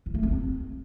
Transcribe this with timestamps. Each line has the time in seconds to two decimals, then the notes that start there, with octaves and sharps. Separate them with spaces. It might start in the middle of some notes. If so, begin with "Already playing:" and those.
0.06 E4
0.14 A3
0.23 C4